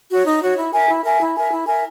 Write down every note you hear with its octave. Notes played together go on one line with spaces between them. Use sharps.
F#4 C#5
D#4
F#4 C#5
E4
A#4 E5 G#5
E4
A#4 E5 G#5
E4
A#4 E5 G#5
E4
A#4 E5 G#5